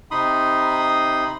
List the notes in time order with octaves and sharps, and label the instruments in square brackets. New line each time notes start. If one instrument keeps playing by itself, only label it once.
[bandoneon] C3 D#4 B5 C6 D#6